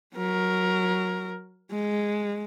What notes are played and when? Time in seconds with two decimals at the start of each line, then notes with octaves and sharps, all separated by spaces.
0.14 F#3 A#4
1.72 G#3